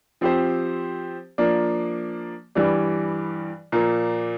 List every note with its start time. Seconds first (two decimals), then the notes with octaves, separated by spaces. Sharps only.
0.21 F3 C4 G4 C5
1.38 F3 A#3 D4
2.55 G2 E3 G3 D4
3.72 A#2 F3 A#3